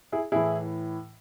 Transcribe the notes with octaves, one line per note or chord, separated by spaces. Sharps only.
E4 G#4
A2 E3 E4 G#4